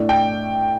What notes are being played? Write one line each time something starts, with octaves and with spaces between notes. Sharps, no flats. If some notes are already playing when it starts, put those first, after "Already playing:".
Already playing: A2 A3 D4
G5